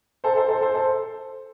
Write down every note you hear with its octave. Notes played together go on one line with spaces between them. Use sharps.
A4 C5
A4 C5
A4 C5
A4 C5
A4 C5